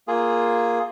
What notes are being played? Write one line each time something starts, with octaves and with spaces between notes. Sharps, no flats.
A#3 F4 G#4